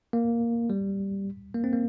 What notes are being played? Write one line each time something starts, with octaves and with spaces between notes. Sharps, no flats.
A#3
G3
A#3
C4
A#3